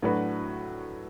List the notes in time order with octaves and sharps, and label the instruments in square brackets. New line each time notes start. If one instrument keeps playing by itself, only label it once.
[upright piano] A2 F#3 D4 F#4 B4